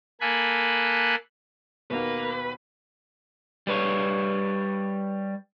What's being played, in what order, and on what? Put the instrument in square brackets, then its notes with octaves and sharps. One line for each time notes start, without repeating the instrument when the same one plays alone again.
[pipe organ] A#3 A4 G#5 B5 F#6
[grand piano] D#2 B2 [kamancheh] A#3 [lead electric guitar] B4
[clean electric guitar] G3 B4 C#5